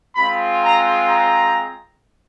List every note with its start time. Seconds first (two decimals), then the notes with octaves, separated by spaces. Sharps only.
0.16 G#3 C4 F4 B5
0.62 A#5
1.08 A#5